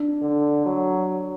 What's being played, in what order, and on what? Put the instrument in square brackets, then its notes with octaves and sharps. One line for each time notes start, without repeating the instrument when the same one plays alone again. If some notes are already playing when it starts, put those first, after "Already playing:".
Already playing: [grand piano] D4
[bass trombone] D3
F#3